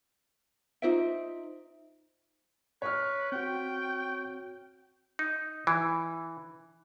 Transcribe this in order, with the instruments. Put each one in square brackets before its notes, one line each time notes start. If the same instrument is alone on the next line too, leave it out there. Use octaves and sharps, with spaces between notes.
[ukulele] D#4 C5 E5 [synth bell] F4 D7
[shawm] B4 [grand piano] C#5 F6
[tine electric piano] C4 F#4 [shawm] G5
[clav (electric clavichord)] D#4
E3